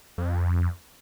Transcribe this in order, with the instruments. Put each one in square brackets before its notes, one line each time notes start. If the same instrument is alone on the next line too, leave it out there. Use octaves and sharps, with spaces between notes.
[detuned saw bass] F2